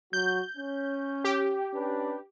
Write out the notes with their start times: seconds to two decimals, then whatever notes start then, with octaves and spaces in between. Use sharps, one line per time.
0.13 F#3 F#4 G6
0.57 C#4
1.24 G4
1.73 C#4 D4 B4